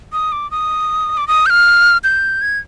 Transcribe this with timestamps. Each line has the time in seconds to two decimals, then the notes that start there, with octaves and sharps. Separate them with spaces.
0.13 D#6
0.32 D6
0.51 D#6
1.17 D6
1.28 D#6
1.46 G6
1.50 F6
2.04 G6
2.42 G#6